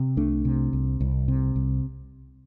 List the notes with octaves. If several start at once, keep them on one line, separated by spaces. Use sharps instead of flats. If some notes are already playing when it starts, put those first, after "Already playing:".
Already playing: C3
C2 A3 D4
C3
C2
C2
C3
C2